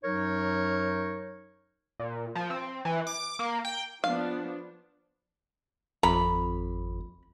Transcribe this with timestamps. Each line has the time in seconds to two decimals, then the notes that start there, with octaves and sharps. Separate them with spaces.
0.04 F#2 F#3 D#4 A#4 C#5
2.00 A#2
2.35 F3
2.50 C4
2.85 E3
3.07 D6
3.39 A#3
3.65 G5
4.04 F3 B3 D4 F5
6.03 G#1 F2 A#5 B5